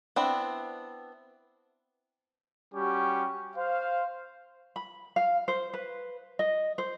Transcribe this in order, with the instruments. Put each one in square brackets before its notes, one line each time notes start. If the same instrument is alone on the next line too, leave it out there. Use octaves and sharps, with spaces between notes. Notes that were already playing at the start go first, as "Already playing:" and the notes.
[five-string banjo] B3 C4 D4 E4
[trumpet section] G3 C#4 F#4 G4 C#6
C5 F5
[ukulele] B5
F5
C5
B4
D#5
C5